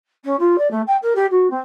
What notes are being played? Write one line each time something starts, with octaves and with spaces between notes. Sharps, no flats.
C#4
F4
D5
A3
G5
A#4
G4
F#4
C4